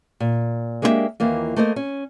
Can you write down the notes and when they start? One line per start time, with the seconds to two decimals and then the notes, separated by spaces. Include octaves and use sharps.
0.20 A#2
0.82 G#3 A#3 D4 E4 G4 E5
1.20 D#2 E3 A#3 F4
1.56 A3 A#3 A#4 C5 D5 D#5
1.76 C#4